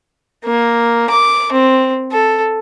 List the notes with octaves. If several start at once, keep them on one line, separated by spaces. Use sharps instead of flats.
A#3
D6
C4
A4